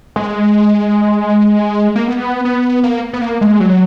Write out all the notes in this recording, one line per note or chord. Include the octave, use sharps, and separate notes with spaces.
G#3
A#3
B3
B3
A#3
B3
A#3
G#3
F#3